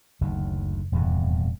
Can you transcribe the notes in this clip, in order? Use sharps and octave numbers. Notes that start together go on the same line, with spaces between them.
F#1 D2 D#3
D#1 E2 G2 C3